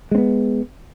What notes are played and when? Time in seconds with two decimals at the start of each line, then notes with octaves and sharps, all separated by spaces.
0.11 G#3
0.15 C4
0.18 B3